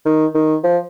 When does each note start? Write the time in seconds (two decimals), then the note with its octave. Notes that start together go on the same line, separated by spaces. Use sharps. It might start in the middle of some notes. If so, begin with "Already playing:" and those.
0.05 D#3
0.35 D#3
0.64 F3